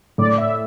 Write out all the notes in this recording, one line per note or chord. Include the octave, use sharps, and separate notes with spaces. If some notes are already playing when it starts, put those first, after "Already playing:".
A2 D5
E5